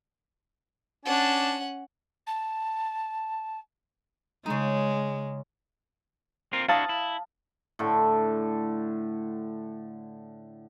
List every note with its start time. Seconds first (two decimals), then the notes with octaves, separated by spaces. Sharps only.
1.05 C#4 D4 F#5 A5
2.26 A5
4.46 C#3 G#3 D#4
6.53 C4 F4 A#4
6.68 D4 E4 F#4 F5 A5 D#6
6.89 E4
7.79 A2 D3